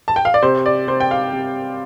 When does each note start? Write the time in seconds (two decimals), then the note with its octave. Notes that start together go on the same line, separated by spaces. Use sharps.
0.08 A5
0.16 G5
0.25 F5
0.34 D5
0.42 C3 C5
0.66 D5
0.87 C3 C5
1.00 G5
1.11 F5
1.33 C3